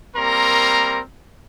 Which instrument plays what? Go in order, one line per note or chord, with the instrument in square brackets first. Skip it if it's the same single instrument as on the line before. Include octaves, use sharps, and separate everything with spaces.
[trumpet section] G3 A#3 C4 A#4 A#5 C6